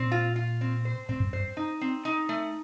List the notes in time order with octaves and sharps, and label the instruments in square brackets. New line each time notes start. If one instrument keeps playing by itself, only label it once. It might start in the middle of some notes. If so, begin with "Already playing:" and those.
Already playing: [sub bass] A#2 [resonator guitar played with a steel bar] C4
[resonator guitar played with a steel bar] F4
F4
C4
C5
[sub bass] A2 [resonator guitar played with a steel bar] C4
[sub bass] G2
[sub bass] G2 [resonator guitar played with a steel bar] C5
[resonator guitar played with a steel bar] D#4
C4
D#4
A3